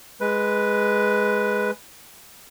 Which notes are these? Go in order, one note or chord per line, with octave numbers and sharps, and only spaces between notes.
G#3 B4